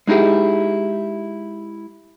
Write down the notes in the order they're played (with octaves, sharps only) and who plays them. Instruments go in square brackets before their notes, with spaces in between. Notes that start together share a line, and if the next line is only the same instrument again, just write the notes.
[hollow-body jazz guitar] G#3 D#4 E4 G4 G#4